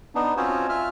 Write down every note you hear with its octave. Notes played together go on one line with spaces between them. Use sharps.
B3 D4 D#4
C4 C#4 F4 F#4 C5 C#5
F4 E5 F6